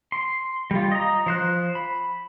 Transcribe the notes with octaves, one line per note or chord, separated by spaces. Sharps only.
C6
G3 F4
D#5 A#5
F3 C5 F#6
B5